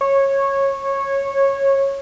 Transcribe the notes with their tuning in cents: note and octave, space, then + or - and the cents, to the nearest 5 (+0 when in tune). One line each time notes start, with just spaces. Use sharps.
C#5 -15